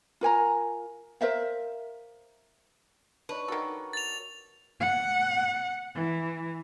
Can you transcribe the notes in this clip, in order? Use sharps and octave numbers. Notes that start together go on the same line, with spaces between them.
F4 A#4 G#5 A#5
A#4 C5 E5 F5
D4 D#4 B4 C#5
D#3 F#4 A4 A#4 F#5
A6 F7
F#5
E3